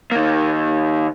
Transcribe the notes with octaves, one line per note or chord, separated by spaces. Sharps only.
D#3 A#3